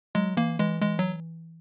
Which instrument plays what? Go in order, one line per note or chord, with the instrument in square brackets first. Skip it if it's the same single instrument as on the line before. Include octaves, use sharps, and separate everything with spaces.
[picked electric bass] F#3 [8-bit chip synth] G#3
[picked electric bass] E3 [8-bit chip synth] A#3
[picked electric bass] E3 [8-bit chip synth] G#3
[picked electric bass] E3 [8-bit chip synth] G#3
[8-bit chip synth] F#3